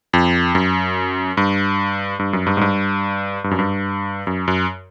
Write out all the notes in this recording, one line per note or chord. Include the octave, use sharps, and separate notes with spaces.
F2
F#2
G2
G2
F#2
G2
G#2
G2
G2
F#2
G2
F#2
F#2